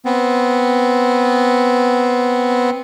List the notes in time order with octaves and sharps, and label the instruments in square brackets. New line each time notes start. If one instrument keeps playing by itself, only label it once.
[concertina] B3 C4